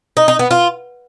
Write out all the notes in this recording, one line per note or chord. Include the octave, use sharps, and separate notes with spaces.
D#4
D#4
B3
F4